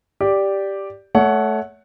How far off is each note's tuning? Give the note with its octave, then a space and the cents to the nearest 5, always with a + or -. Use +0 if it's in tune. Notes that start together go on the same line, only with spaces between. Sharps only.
G4 +0 D5 -5
A3 -15 C#5 +20 F#5 +0